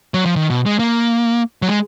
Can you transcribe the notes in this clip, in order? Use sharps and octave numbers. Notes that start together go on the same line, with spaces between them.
F#3
F3
D#3
B2
G#3
A#3
F#3
G#3